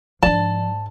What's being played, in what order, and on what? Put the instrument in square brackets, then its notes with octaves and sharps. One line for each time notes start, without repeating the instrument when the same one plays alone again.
[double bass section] G#2 [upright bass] F3 D4 [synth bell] D5 [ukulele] A5